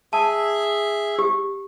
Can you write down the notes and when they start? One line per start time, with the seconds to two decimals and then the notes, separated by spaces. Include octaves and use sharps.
0.13 G#4 E5 A5
1.19 G4